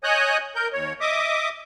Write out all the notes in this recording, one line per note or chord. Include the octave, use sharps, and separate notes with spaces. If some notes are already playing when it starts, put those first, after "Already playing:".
C#5 D#5 G#5 D#6 F#6 G6
A#4 G6
D#2 C#5
D#5 E5 D6 D#6